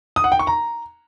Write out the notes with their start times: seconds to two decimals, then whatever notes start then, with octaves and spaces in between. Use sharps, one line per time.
0.16 D#6
0.24 F#5
0.32 G5
0.39 C#6
0.47 A#5